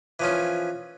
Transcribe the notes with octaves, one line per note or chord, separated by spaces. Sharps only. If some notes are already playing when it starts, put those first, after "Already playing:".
E3 F3 C#4